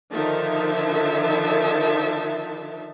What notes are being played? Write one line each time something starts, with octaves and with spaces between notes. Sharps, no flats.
D3 D#3 F3 D#4 E5 A5